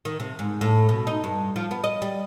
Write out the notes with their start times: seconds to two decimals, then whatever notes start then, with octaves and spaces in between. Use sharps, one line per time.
0.05 D#3
0.20 C3
0.39 G#2
0.61 A2
0.89 B2
1.07 D#4
1.24 G2
1.56 F3
1.71 B3
1.84 D#5
2.02 G3